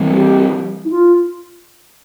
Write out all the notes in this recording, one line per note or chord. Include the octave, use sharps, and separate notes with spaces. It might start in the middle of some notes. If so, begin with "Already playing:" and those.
Already playing: E3 G3 C4
G4
E4
F4